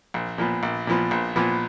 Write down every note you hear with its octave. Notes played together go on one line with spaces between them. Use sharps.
A#1
A#2 F3 B3
A#1
A#2 F3 B3
A#1
A#2 F3 B3